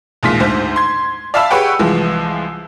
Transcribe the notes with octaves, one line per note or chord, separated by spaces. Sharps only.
A1 D#2 A#2 G#3 B6
D2 G#2 C5
C6 G#6
D5 E5 F5 A5 B5 E6
G4 G#4 B4 C#5 F#5 G5
C2 E3 F3 G#3